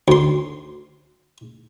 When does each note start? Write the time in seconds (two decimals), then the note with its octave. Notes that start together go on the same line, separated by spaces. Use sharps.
0.08 D2 C6